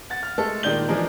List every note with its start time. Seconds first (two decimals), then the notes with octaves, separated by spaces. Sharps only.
0.10 F#5 A6
0.23 F6
0.38 G#3 A3 A4
0.63 A#2 D#3 G#3 D5 G6 G7
0.88 E3 F3 G#3 D4 G#4 A#4